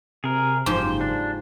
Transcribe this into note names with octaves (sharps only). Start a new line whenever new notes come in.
C3 G#4 A#4
F#1 G#2 F3 G4 C5
D4